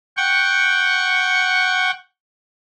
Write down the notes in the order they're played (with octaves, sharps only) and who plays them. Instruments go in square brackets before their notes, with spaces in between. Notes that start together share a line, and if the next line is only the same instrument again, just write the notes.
[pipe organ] F#5 G5 C#6